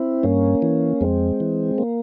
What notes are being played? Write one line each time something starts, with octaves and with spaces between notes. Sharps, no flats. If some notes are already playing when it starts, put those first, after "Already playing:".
Already playing: C4 E4
G2 A#3 C#4
E3
F2 G#3 C4
E3
A#3